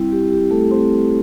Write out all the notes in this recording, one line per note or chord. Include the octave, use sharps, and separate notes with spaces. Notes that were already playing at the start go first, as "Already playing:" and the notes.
Already playing: G3 C4 E4
G4
G4
A3 A4
C4 C5